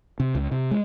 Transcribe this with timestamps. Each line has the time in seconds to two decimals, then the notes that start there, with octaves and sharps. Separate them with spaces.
0.20 C3
0.35 C#2
0.51 C3
0.71 G#3